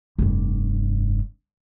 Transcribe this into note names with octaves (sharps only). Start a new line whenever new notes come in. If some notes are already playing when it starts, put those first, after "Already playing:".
F1 G2